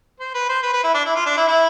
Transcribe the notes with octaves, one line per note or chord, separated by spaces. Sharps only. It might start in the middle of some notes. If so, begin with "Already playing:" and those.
C5
B4
C5
B4
B4
E4
D4
E4
F4
D4
E4
E4